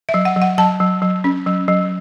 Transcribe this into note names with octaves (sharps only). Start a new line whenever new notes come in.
E5
F#3
F#5
F#3
F#5
F#3 A5
F#3
F#3
C#4
F#3
F#3